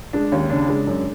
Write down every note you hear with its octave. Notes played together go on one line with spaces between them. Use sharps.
G#3 D4
D#2 C#4
C#3 D4
G#3
F#2